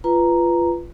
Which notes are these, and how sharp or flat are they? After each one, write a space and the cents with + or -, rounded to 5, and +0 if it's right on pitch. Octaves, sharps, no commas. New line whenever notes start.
F4 -20 B4 +0 A#5 +0